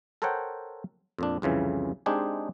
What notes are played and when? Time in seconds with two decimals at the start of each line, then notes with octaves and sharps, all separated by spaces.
0.22 A4 A#4 C5 C#5 F#5 G5
1.19 F2 A#2 D4
1.42 C2 F2 C#3 E3
2.06 G#3 C4 D4 D#4 G4 G#4